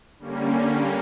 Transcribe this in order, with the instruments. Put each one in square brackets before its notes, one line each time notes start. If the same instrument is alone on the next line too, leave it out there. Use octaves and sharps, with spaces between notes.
[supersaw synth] D3 G3 A#3 C#4